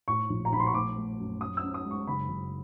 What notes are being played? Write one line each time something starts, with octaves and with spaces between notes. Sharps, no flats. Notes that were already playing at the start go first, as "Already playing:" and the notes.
A2 C#6
A#1
A#5
A#1 B5
C6
C#6
A3 D6
A3
F#2
F#2 D#6
E6
C#4
D#6
G#3
C#6
F#1 B5
F#1